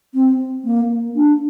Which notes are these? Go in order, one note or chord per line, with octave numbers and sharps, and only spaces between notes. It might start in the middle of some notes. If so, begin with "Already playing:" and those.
C4
A#3
D4